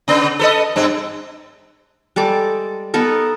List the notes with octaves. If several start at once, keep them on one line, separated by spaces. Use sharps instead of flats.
C#3 B3
A4 B4 D#5
G2 C4
G3 G#3 A4 D6
B3 D#4 A4 A#4